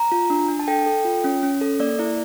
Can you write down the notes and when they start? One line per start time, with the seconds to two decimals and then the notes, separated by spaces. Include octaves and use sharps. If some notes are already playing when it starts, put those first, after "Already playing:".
Already playing: A#5
0.12 F4
0.30 D4
0.48 D4
0.59 A5
0.68 A4 G5
0.86 A4
1.05 F4
1.24 C#4
1.43 C#4
1.61 A4
1.80 A#3 D5
1.99 E4 D5